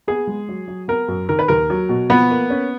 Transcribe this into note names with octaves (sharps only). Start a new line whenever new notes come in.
B3 G#4
G#3
F#3
F#3
B3 A#4
F#2
D#3 A#4
B4
D#2 A#4
F#3
B2
F3 B3 B4
A#3
C#4